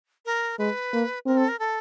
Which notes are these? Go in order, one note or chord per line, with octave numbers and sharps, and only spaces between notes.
A#4
G#3 B4
A#3
C4 A#4
A4
A#4
A4